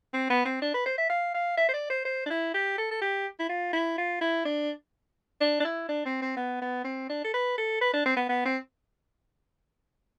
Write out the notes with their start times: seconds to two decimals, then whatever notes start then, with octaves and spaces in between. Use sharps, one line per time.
0.14 C4
0.30 B3
0.45 C4
0.62 D4
0.74 B4
0.86 C5
0.98 E5
1.10 F5
1.34 F5
1.57 E5
1.69 C5
1.74 D5
1.90 C5
2.05 C5
2.26 D4
2.30 E4
2.54 G4
2.78 A4
2.91 A4
3.02 G4
3.39 E4
3.49 F4
3.73 E4
3.98 F4
4.21 E4
4.45 D4
5.41 D4
5.60 D4
5.65 E4
5.89 D4
6.06 C4
6.22 C4
6.37 B3
6.62 B3
6.84 C4
7.09 D4
7.24 A4
7.34 B4
7.58 A4
7.81 B4
7.93 D4
8.06 C4
8.17 B3
8.29 B3
8.45 C4